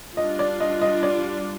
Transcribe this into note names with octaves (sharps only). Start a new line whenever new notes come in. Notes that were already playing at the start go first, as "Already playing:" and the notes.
G3 D4 F4 D#5
D5
D#5
D#5
D5